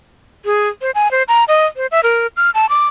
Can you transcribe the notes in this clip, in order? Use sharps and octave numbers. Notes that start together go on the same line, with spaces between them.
G#4
C5
G#5
C5
A#5
D#5
C5
E5
A#4
F6
A5
D6